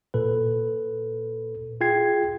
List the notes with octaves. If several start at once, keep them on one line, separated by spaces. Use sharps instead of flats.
A#2 A4 B4
F4 G#4 G5 G#6 C7